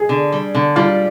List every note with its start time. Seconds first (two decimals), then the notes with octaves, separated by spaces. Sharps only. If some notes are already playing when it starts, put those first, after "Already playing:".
Already playing: G#4
0.09 D3
0.32 G3
0.55 D3
0.76 G3 F4